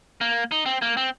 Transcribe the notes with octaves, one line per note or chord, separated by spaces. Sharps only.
A#3
D#4
C4
A#3
C4